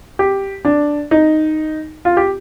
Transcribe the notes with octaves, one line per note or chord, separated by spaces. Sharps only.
G4
D4
D#4
F4
G4